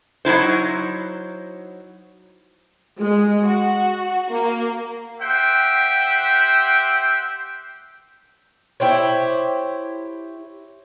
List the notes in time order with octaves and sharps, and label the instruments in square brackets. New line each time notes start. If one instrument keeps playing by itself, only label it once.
[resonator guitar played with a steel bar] F#3 D#4 E4 C5
[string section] G#3
F#4
A#3
[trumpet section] G4 C5 E5 F#5 G5
[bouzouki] E4 G4 C5 C#5